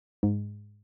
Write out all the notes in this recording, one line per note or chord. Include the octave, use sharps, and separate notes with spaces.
G#2